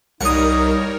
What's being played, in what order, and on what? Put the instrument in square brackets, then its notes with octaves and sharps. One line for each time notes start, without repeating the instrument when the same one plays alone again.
[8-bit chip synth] C2 [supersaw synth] G3 A#4 C#5 [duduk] D#4 [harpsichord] F#5 D#6